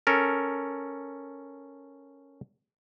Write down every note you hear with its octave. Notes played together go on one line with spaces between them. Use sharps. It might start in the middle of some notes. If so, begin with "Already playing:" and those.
C#4 A4 A#4